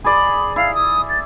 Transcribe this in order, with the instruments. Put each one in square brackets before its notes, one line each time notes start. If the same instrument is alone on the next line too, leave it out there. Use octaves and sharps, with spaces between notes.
[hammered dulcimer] G#4 D5 [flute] B5
[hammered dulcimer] E4 [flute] F5
[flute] D#6
A6